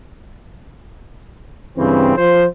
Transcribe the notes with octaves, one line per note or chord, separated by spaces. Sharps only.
G2 C#3 E3 C4
F3 C5